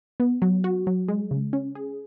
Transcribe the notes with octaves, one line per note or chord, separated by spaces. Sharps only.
B3
F#3
F#4
F#3
G#3
C#3
C#4
G#4